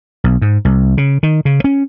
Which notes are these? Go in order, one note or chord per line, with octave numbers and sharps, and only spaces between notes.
B1
G#2
C2
C#3
D#3
C#3
C#4